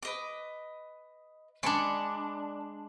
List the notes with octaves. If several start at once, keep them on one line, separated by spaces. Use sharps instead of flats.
B4 D#5 D6
G#3 D4 D5 B5 C#6